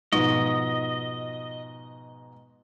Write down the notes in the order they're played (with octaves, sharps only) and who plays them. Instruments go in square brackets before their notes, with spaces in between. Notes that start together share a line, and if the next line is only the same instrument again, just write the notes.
[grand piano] G#2 B2 F3 [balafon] D#4 [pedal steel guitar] D#5